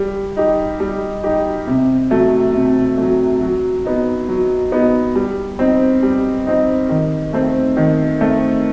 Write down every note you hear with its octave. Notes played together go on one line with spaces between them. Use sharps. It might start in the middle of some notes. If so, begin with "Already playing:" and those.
Already playing: G3
D#4 G4
G3
D#4 G4
C3
F#3 A3
C3
F#3 A3
F#3
B3 D#4
F#3
B3 D#4
G3
C4 D#4
G3
C4 D#4
D#3
A3 C4
D#3
A3 C4